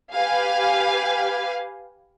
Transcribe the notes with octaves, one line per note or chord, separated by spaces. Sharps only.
G4 B4 F5 G#5